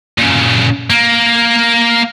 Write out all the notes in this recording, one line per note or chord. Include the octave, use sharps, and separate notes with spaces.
A#2 C#3
A#3